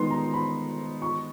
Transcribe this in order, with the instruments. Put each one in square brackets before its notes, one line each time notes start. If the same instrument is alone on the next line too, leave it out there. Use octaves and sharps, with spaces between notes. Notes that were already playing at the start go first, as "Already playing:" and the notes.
Already playing: [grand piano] D#3 G#3 B3 D#4 [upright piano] C6
[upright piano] A#5
B5
C#6